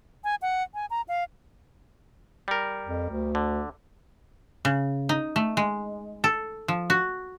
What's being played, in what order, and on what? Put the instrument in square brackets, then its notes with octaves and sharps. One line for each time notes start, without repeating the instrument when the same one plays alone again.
[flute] G#5
F#5
G#5
A#5
F5
[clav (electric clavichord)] G3 A#4
[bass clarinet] F2
D2
[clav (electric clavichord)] D3
[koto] C#3
D#4
A3
G#3
A4
F3
F#4